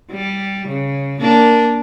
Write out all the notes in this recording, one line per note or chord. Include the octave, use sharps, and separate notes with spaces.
G3
C#3
A#3 D4